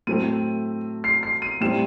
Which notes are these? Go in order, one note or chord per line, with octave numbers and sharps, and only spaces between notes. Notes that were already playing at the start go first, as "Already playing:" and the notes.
A2 F#3 A3 C4 D#7
C7
C7
D#7
A2 G3 C4 E7